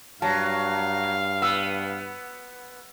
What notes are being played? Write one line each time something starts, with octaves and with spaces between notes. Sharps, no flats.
G2 F#3 F5 A5
B3 E6